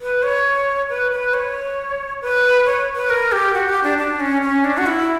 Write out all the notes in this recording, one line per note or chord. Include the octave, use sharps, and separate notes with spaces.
B4
C#5
B4
B4
C#5
B4
C#5
B4
A#4
G4
F#4
G4
D4
D4
C#4
C#4
D4
F#4
E4